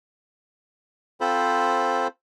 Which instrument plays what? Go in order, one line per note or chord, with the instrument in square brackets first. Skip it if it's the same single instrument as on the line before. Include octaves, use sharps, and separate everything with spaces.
[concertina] C4 F4 A4 C5 B5